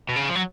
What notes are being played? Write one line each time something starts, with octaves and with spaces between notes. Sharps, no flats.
B2
C#3
F3
F#3